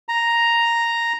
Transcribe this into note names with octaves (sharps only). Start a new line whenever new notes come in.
A#5